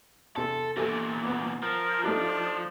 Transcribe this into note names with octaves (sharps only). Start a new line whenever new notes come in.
E2 C3 A4
E2 A#2 G4 A4 G#5
B3
F3 A#4
A3 D4 D#4 G4